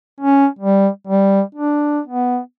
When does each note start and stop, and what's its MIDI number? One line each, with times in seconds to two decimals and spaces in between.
0.20 0.46 61
0.59 0.88 55
1.07 1.41 55
1.55 2.00 62
2.08 2.38 59